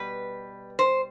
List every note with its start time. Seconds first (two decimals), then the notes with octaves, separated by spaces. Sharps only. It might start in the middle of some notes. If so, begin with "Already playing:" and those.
Already playing: B2 G3 B4
0.79 C5